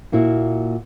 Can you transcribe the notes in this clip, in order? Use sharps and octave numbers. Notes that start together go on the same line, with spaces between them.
A#2 A#3 E4 F#4